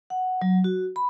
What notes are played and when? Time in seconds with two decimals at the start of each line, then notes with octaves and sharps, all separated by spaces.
0.10 F#5
0.42 F#3
0.64 F#4
0.96 B5